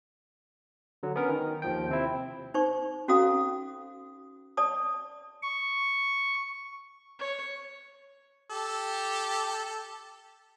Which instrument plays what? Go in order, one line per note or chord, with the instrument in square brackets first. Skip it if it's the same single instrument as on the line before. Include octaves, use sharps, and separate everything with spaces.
[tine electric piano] D3 F#3
B3 C#4 A#4
D#3
D#2 F3 G5
C3 C4 E4
[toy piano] D#4 C5 C#6
C#4 F#4 A4 F5 A#5 D#6
D5 A5 D#6
[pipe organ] C#6
[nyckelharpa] C#5
[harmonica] G4 A4